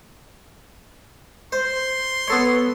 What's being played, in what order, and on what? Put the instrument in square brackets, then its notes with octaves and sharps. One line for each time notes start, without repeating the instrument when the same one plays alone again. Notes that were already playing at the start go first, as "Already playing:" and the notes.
[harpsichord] C5 [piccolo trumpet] C6
[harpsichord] B3 A4 C#5